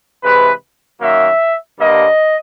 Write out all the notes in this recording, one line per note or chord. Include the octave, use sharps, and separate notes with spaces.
C3 E3 G#3 B4
F#2 D#3 F#3 A#3 E5
G2 D3 G3 A#3 D#5